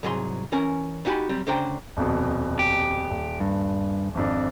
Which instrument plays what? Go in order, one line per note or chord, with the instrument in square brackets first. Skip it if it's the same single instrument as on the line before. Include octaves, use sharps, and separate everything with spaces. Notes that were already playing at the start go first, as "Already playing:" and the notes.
[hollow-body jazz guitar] C2 G#2 F#3 G#4 A#5 C6
E3 C#4 A#4 G#5
B3 D#4 F#4 G4 G#5 B5
F#3 G3 C4
D2 C#3 D4 C5 G5 A#5
[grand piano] D#1 F2 B2
[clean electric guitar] G4
[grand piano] D#1
[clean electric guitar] G2
[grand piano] G#1 F2 D4